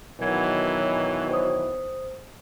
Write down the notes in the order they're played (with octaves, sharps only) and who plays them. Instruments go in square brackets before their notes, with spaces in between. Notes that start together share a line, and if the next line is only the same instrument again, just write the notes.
[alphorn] B2 [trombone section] D#3 E3 F#3 [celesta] A#4 G#6 [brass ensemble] C#5
[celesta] C5 D#6